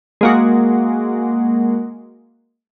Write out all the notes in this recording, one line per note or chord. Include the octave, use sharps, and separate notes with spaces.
G#3 A#3 F#4